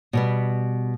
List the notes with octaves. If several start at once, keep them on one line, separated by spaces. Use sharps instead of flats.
B2 G3 B3